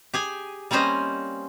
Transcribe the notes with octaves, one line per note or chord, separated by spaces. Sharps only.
G4 G#4 G#5
G3 A#3 C4 C#4 C5 D#5